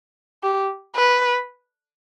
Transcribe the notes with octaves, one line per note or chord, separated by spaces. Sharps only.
G4
B4